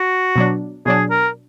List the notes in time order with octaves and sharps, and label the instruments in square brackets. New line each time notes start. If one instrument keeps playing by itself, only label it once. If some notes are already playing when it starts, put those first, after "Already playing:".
Already playing: [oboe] F#4
[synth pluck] B2 F#3 D4
[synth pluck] B2 F#3 D4 [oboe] G#4
[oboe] A#4